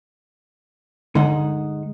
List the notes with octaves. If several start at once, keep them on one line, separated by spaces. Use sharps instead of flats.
D3 G#3 D#4 F#5